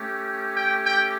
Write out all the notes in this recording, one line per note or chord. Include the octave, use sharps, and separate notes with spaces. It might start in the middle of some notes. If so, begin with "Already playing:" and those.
Already playing: A3 C#4 G4
G5
G5